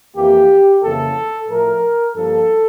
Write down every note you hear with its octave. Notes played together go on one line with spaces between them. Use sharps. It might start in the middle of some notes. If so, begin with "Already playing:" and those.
F2 E3 A#3 G4
F2 C#3 E3 A#3 A4
A2 F3 A3 A#4
G2 F3 A#3 A4